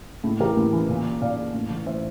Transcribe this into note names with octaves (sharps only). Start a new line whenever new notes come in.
A2
E3 G4 A#4
A2
E3
A#2
A#2 D5 F5
A2
E3
A2 C5 E5